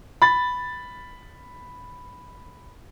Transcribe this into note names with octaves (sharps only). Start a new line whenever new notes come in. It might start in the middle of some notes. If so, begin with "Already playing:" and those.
B5 A6